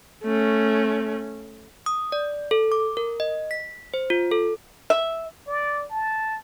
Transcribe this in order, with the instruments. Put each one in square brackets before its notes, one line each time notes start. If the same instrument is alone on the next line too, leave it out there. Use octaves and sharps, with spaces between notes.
[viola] A3 C#4
[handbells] D#6
D5
A4
D6
A#4
D#5
B6
C5
F4
A4
[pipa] E5
[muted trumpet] D5
A5